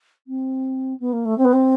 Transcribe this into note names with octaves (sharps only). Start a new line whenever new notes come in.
C4
B3
A#3
A3
C4
B3
C4